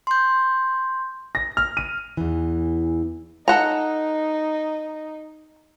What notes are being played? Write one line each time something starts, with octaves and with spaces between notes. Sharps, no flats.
C6 G6
A#6
F6
D#7
E2 E3
D#4 A4 F#5 A#5